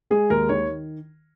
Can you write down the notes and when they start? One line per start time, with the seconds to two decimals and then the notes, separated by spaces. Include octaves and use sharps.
0.10 G#3 G#4
0.30 D#2 A#4
0.49 D#3 C#5